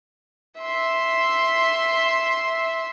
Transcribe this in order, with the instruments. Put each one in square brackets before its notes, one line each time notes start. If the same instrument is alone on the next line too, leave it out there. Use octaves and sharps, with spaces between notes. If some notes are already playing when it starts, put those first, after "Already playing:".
[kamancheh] E5 C6